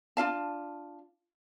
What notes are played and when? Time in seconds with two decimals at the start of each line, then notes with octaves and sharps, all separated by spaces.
0.17 D4 F4 F5 A5